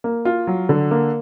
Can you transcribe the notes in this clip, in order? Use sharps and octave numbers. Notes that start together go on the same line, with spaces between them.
A#3
F4
F#3
D3
A#3